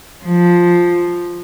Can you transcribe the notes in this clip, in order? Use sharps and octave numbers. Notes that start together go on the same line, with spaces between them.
F3